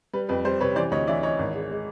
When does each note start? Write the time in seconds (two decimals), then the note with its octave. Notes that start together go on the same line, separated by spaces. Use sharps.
0.13 G3 B4
0.29 F2 B4
0.45 G3 C5
0.61 C3 B4 C#5
0.76 E3 C5 D5
0.91 D2 C#5 D#5
1.07 E3 D5 E5
1.23 E3 C#5 D#5
1.39 G#1
1.54 G#3
1.71 G#3